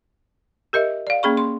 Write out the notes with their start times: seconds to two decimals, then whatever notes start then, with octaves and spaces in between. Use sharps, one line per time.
0.73 G4 A#4 D#5 E5
1.07 D5 F5
1.23 A#3 C#4 G#4 B5 C#6
1.37 C6